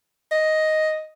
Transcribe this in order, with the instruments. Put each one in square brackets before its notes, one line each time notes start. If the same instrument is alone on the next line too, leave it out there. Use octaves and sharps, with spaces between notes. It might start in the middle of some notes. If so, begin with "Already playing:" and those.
[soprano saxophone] D#5